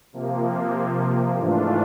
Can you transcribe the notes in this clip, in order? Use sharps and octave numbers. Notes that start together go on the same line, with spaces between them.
C3 F3 A#3
G#2 E3 A3 D4 F4